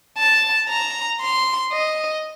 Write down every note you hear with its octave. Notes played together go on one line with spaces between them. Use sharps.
A5
A#5
C6
D#5